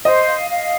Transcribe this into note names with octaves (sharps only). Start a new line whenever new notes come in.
C5 D#5
F5
F5